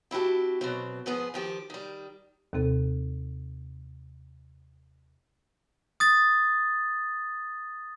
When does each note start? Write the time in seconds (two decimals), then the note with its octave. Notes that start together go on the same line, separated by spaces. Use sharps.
0.11 C4 E4 F#4 G4 A5
0.61 B2 F#3 C4
1.06 G#2 F3 B3 G#4
1.34 D#3 F3 G4
1.70 D#3 G3
2.53 D#2 C3 C4 A4
6.00 D#6 A6